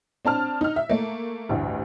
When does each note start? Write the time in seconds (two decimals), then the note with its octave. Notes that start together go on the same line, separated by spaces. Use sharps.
0.25 C4 D4 A5 F6
0.61 D#4 F6
0.76 E5
0.90 A3 A#3
1.49 A1 D2 G2